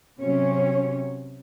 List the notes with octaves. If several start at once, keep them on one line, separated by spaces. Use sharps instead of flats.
C3 F#3 C#4 C#5